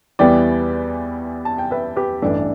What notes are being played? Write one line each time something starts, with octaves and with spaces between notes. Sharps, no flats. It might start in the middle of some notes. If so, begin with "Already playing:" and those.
E2 E3 G3 B3 D5 G5
A5
G5
B4 E5
G4 B4
A1 G2 E3 A3 D4 A4